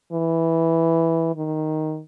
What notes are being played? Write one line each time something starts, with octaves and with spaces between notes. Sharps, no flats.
E3
D#3